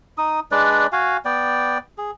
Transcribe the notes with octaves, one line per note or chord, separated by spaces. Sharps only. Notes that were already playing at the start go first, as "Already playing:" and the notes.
D#4 D#6
G#3 D4 B4 D5
F#4 F5 G#5
B3 D5 G5
G#4